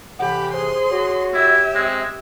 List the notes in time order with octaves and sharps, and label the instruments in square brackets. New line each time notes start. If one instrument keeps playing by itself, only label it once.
[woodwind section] A2 C3 E3 [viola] G4 B5 [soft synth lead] F#5
[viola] G#4 C6 [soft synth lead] C5
[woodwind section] F#4 [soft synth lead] C#5
[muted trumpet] E4 [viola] G4 E5
[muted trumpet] G#3 [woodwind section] C4